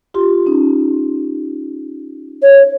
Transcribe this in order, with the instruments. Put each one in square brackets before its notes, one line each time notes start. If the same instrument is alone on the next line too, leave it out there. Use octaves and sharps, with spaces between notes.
[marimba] F4 G4 C6
C#4 D#4
[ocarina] C#5